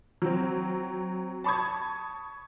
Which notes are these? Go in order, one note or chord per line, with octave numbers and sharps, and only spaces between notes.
F#3 C4
A5 B5 C#6 D#6 G#6